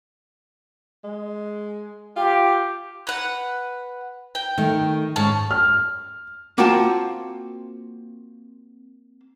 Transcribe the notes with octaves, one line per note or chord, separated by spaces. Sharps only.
G#3
F4 G4
B4 F#5
G5
D#3 A3
G#2 C#4 A5
F6
A#3 C4 F4 F#4 G5 A5